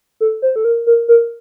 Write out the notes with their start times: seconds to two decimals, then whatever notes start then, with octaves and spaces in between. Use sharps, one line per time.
0.20 A4
0.42 C5
0.56 A4
0.64 A#4
0.87 A#4
1.08 A#4